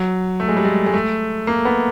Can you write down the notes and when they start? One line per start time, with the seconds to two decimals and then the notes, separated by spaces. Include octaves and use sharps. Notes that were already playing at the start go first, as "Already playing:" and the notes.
Already playing: F#3
0.40 A3
0.48 G#3
0.57 G3
0.65 G#3
0.86 G#3
0.94 A3
1.47 A#3
1.65 B3